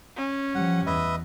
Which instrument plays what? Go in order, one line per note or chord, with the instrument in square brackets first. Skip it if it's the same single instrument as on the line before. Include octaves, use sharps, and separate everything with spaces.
[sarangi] C#4
[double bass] F3 G3 [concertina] F#5
[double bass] E2 [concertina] B4 D#5 E5